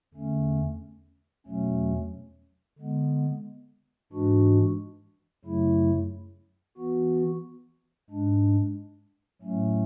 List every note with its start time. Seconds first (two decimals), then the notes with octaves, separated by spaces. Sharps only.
0.14 E2 D3 A3 C#4
1.46 E2 B2 F#3 A3 C#4
2.79 D3 G#3 B3
4.12 G#2 E3 G#3 D4 F#4
5.45 F#2 C#3 F#3 A3 E4
6.77 E3 B3 F#4
8.10 G#2 G#3 D4
9.42 A2 F#3 A3 C#4